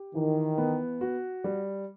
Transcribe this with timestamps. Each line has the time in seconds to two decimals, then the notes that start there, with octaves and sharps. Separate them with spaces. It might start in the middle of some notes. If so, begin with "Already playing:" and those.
Already playing: G4
0.14 D#3 E3
0.58 B3
1.01 F#4
1.44 G3